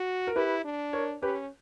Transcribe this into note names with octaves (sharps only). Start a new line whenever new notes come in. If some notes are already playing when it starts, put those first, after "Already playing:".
Already playing: F#4
A#4
E4 G4 B4
D4
A#4 C#5
C#4 G4 B4